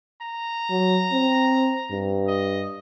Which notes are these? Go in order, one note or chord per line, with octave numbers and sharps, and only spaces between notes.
A#5
F#3
C4
G2
D#5